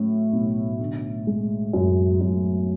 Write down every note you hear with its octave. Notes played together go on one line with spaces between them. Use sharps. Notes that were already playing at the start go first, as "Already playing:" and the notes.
Already playing: A2 F#3 C#4
B1
D3
G#3
F#2
F#2